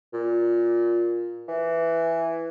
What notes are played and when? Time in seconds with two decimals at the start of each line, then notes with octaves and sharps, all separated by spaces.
0.13 A#2
1.48 E3